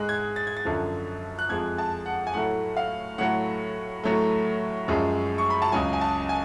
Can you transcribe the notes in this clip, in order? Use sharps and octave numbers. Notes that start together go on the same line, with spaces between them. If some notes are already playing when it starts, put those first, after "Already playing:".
Already playing: G#2 G#3 F#6
G#6
A6
G#6
A6
F#2 D3 F3
F#6
F2 F3 G#3 G#6
A5
F#5
G#5
A2 F#3 A3 F#5
F5
A2 F#3 A3 F#5
A2 F#3 A3
F#2 F3 G#3
C#6
B5
A5
C#2 C#3 F#3 G#5
G#5
A5
G#5